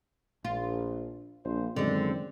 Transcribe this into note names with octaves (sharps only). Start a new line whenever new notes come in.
A#1 F4
A#1 C5
F#2 D3 D#3 G#3 C4